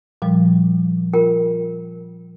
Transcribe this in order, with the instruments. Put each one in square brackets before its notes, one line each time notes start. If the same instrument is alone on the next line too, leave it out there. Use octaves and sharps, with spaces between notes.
[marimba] A#2 F3 G3
[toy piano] F4 A#4 G5